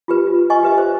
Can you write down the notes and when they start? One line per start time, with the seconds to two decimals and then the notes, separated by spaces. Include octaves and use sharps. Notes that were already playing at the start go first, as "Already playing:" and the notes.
0.08 F4 G4 B4
0.27 F4
0.50 D#5 G#5 C#6
0.63 G4 B4 E5
0.78 C5